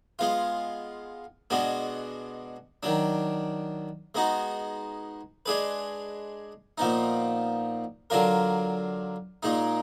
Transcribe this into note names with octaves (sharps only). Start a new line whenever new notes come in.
G#3 B3 F4
B2 G#3 B3 D4 F#4
D#3 F#3 D4
G#3 B3 D#4 F#4
G#3 D4 G#4 B4
A#2 F3 B3 D#4
D3 F#3 D4 F4 A#4
A#2 G#3 D#4